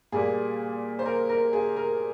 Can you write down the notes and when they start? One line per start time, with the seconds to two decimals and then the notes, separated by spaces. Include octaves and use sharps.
0.12 A#2 G3 A#3 G#4
0.99 C5
1.06 A#4
1.29 A#4
1.53 G#4
1.76 A#4